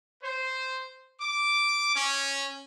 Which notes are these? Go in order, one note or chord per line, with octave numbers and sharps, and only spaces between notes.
C5
D6
C#4